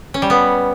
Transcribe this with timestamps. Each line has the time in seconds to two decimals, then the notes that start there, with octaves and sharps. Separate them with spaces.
0.14 C#4
0.22 G3
0.30 B3